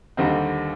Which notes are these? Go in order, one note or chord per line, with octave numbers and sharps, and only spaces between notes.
D#2 D3 G3 C4 D#4